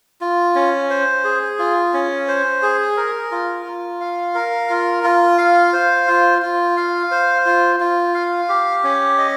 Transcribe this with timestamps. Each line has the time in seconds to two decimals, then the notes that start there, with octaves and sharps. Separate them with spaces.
0.21 F4
0.55 C#4
0.90 C5
1.24 G#4
1.59 F4
1.93 C#4
2.28 C5
2.62 G#4
2.97 A#4
3.32 F4
3.66 F4
4.01 F5
4.35 A#4
4.70 F4
5.04 F4
5.38 F5
5.73 C5
6.07 F4
6.42 F4
6.77 F5
7.11 C5
7.46 F4
7.80 F4
8.15 F5
8.49 G4
8.84 C#4
9.18 D#5